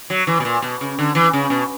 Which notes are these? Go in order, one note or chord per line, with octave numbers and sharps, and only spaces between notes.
F#3
E3
B2
A#2
B2
C#3
D3
E3
C#3
B2